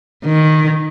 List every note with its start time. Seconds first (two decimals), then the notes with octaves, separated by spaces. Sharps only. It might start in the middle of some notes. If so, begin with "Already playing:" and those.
0.25 D#3